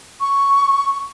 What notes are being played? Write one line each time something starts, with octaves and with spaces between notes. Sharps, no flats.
C#6